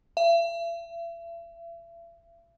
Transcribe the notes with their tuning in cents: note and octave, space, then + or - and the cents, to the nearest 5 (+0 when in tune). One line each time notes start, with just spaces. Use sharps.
E5 +40